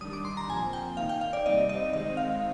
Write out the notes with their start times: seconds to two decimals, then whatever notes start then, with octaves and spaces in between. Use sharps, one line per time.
0.01 D#3 G3 D4 D#6
0.13 D6
0.25 C6
0.37 A#5
0.49 A#2 F3 C4 G#5
0.73 G5
0.97 D#3 A#3 D#4 F5
1.09 G5
1.21 F5
1.33 D5
1.45 C3 G3 C4 D#4 D#5
1.69 D#5
1.93 D#3 G#3 C4 D#4 D#5
2.17 F5